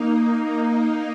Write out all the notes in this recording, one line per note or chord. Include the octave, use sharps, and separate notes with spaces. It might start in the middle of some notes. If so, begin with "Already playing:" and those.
Already playing: A#3 D#4
A#3 D#4
A#3 D#4